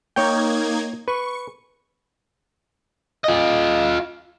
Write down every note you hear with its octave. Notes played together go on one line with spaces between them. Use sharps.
A#3 D#4 C#5 G5 G#6
B4 C#6
F4 D#5